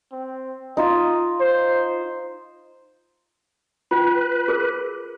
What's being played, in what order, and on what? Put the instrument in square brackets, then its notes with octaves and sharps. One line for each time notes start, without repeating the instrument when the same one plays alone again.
[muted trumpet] C4
[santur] D#4 F4 [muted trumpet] D#5
[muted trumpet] C5
[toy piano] F4 G5 [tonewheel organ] B4
[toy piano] G#4 A#4